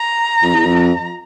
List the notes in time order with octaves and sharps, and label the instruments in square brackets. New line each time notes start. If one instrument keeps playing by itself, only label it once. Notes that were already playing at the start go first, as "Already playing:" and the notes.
Already playing: [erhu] A#5
[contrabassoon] F2
E2
F2